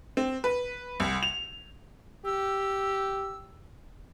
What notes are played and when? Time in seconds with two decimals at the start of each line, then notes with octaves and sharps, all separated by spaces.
0.17 C4
0.44 B4
1.00 C2
1.23 F7
2.25 G4 E6